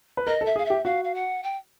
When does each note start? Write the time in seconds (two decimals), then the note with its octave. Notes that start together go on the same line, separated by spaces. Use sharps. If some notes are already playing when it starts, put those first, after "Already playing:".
0.17 B4
0.27 A#4 D#5
0.41 A4
0.46 E5
0.56 G#4 F5
0.65 G4 E5
0.85 F#4 F5
1.04 F5
1.14 F#5
1.43 G5